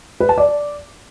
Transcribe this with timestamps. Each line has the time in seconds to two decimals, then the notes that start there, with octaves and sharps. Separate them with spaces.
0.20 B4
0.29 A5
0.38 D5